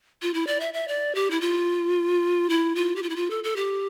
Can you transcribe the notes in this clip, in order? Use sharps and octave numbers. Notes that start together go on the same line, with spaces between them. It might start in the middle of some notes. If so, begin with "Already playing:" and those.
F4
E4
D5
E5
E5
D5
G4
E4
F4
E4
F4
G4
F4
E4
F4
A4
A4
G4